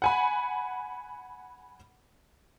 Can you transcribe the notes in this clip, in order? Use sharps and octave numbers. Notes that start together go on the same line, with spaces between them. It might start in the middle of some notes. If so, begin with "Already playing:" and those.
F#5 G#5 B5